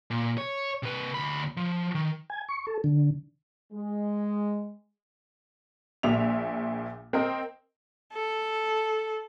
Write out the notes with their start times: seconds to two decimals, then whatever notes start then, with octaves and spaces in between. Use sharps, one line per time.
0.10 A#2
0.38 C#5
0.83 C3 B4
1.14 D2 B5
1.57 F3
1.95 D#3
2.30 G#5
2.49 C#6
2.67 A4
2.84 D3
3.73 G#3
6.03 A#1 A#2 E5 F7
7.13 C4 A#4 D#5
8.13 A4